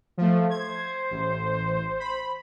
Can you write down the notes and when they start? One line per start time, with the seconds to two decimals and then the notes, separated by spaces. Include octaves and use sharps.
0.18 F3 A3
0.50 C5 G#6
1.11 A1
2.00 B5